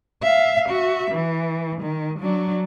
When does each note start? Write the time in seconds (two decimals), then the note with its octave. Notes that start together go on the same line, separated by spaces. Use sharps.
0.23 E5 F5
0.69 F#4 E5
1.11 E3
1.81 D#3
2.19 F#3 D4